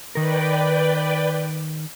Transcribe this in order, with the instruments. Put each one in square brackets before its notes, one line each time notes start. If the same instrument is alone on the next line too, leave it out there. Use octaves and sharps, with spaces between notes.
[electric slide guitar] D#3 A#4 [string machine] B4 D5 G5